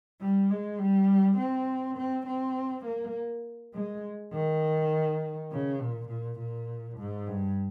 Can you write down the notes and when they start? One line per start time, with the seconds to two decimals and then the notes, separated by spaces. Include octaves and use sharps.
0.21 G3
0.51 G#3
0.79 G3
1.38 C4
1.97 C4
2.27 C4
2.85 A#3
3.74 G#3
4.33 D#3
5.51 C#3
5.81 A#2
6.09 A#2
6.39 A#2
6.99 G#2
7.28 G2